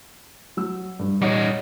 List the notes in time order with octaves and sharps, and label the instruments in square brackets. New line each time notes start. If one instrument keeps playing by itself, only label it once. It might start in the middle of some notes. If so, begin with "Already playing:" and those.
[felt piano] F#3 E6
G2
[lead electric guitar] G3 D#4 [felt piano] C#5 F#5 D6